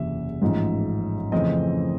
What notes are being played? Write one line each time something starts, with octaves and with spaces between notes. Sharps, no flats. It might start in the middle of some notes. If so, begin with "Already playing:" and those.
Already playing: F#1 E2 C3 E5
A1 G#2 F3
F2 C#3 E3 A3 C4 D#5